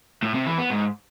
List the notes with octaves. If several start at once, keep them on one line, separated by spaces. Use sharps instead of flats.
A2
C3
E3
B3
G#2